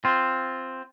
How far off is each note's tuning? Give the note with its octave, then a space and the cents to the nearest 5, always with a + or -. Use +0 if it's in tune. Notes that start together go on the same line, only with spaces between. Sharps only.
C4 +0 F4 +0